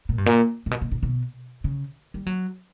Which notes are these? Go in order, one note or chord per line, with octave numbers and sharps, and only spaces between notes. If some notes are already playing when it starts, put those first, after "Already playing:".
A#2
G2
A#2
A#2
B2
A#2
A#2
B2
C#3
G3
F#3